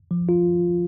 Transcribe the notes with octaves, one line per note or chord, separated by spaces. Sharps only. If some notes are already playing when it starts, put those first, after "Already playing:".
F3
F4